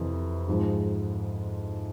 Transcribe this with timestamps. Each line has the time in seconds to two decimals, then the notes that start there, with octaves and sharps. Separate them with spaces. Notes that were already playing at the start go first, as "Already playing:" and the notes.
Already playing: F2 C3 E3
0.48 G#2 F3 G#3